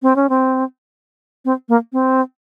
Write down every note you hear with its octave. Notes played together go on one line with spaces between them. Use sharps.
C4
C#4
C4
C4
A#3
C4